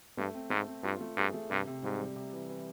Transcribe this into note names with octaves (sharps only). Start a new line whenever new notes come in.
G2 A3
C4
G#2 A3
C4
G2 F4
A3
G2 G#4
A3
G2 C3
C3
G#2 G3
G3
C3
E3
E3